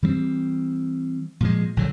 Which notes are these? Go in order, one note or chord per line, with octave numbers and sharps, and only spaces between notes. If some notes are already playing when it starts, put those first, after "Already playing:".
E3 G3 A3 C4
A#2 F3 G#3
A#1 D3 F#3